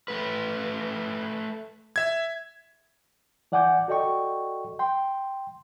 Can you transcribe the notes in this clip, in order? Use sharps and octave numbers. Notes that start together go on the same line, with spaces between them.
A3 B4
E5 G#6
E3 D5 F#5 G#5 D6 G6
F#4 A4 D5 D#5 G5 C#6
G5 C6